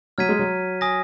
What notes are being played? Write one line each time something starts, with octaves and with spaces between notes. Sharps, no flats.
F#3 F6 G#6 B6 D#7
G#3
F#3
G#5 D#6 A#6